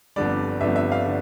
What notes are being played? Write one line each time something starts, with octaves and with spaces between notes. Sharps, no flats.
G1 F2 D3 G3 D5
G1 F2 D3 G3 E5
E5
F5
D3